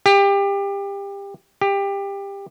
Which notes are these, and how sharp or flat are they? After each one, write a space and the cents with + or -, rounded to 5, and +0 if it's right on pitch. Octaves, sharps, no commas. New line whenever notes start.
G4 +25
G4 +20